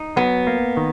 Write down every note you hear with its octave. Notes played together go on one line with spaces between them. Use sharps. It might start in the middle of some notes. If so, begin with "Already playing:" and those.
Already playing: D#4
F#3 B3
A#3
D#3